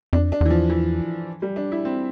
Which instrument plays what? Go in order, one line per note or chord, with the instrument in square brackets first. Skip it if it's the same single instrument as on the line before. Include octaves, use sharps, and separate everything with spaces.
[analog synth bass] F2 [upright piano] D4
[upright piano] D4
[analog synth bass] E2 [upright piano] E3
[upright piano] F3
E3
G3
D4
E4
C4